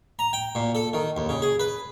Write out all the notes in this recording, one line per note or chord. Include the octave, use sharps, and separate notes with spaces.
A#5
G5
A#2
A4
D#3
D#2
C#3
G#4
B4